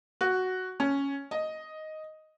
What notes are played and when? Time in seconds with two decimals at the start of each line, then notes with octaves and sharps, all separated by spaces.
0.21 F#4
0.80 C#4
1.31 D#5